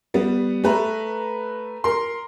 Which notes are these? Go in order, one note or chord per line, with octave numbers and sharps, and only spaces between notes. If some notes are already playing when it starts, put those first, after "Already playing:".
G3 B3
A3 B4 A#5
A#4 C6